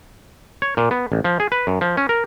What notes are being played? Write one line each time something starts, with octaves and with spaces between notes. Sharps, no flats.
C#5
A#2
B3
A1
F3
G#4
B4
F#2
F3
C#4
A#4